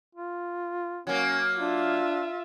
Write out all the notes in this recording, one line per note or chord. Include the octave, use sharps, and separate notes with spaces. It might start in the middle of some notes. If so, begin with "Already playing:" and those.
F4
F#3 A#3 C#4
D4 F4 E5